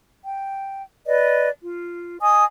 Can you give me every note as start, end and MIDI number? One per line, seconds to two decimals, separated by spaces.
0.24 0.83 79
1.07 1.48 71
1.07 1.48 74
1.07 1.48 75
1.62 2.17 65
2.21 2.44 75
2.21 2.44 80
2.21 2.44 87